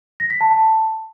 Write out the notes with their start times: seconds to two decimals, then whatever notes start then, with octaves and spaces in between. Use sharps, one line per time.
0.20 A#6
0.30 B6
0.41 A5
0.51 A5